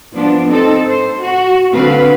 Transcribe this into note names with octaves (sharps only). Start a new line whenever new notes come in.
F3 B3 D4
C4 D#4 A4
C5
F#4
D3 C4 F#4 B4 F5